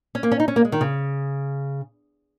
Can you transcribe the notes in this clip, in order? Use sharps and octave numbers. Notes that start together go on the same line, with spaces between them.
C#4
A#3
C#4
D#4
C#4
A#3
G#3
D#3
C#3